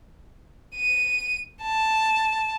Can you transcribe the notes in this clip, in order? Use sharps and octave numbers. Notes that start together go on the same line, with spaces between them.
D#7
A5